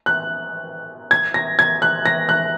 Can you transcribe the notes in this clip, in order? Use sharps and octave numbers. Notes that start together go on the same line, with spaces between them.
F#6
G#6
A#6
G#6
F#6
A#6
F#6